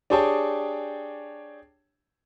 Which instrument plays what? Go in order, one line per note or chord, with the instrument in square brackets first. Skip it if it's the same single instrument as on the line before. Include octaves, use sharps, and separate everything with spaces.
[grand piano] D4 G4 G#4 C#5 G5 A5